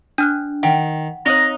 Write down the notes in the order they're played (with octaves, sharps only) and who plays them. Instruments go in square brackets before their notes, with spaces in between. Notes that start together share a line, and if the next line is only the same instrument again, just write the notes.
[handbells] D4 [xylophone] G#5 F6 F#6
[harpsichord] D#3 [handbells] F#5 [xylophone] G5
[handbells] C4 C#5 [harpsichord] D#4 D#5 [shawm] A#5